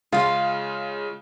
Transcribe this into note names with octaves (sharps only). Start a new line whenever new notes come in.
C#3 G#3 F4 F5